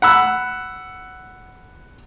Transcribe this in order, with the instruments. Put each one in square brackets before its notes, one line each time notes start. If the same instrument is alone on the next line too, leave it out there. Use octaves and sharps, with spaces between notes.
[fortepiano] F#5 B5 E6